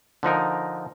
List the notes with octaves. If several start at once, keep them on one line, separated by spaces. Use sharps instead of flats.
D3 F3 D#4 A#4